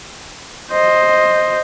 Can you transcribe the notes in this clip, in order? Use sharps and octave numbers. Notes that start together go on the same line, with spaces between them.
C5 D#5